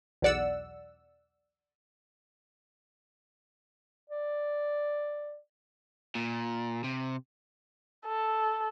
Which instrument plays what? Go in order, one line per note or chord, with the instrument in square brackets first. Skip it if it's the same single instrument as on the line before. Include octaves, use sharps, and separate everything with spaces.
[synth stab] B1 E2 D5 F#5 E6
[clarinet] D5
[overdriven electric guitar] A#2
C3
[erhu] A4